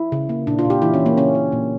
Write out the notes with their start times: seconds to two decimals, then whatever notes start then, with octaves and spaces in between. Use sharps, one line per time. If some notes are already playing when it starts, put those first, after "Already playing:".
Already playing: E4
0.12 C#3
0.29 A#3
0.47 A#2 D4
0.59 F4
0.65 A#2
0.70 G4
0.82 E3 E4
0.94 C#4
0.99 E3
1.06 A#3
1.17 C#3 C#4
1.35 A#3
1.52 A#2